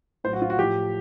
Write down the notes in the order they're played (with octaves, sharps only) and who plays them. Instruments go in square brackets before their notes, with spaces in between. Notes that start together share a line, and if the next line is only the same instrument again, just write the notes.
[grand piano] A2 F#3 C5
F#4
F4
F#4
A2 F3 G4